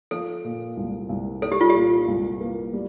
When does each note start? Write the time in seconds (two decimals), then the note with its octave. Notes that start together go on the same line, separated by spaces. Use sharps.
0.11 F3 A4
0.44 A#2
0.77 C2
1.09 C2
1.42 G3 A4
1.52 G4
1.61 F4
1.70 G4
1.75 A#2
2.08 C2
2.40 A#3
2.73 G3